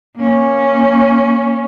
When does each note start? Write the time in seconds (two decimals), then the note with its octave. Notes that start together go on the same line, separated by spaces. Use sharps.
0.16 A#3 C#4